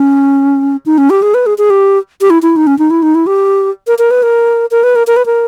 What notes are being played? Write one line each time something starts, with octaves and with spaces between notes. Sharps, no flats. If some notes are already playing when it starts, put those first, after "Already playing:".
Already playing: C#4
D#4
C#4
G4
G#4
B4
G#4
G#4
G4
G4
E4
E4
D#4
C#4
D#4
E4
D#4
E4
G4
A#4
A#4
B4
A#4
A#4
B4
A#4
A#4
B4
A#4